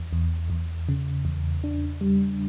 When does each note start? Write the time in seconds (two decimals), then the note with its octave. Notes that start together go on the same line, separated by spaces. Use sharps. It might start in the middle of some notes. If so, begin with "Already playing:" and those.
Already playing: E2
0.13 E2
0.50 E2
0.89 C#3
1.25 E2
1.64 D4
2.01 G3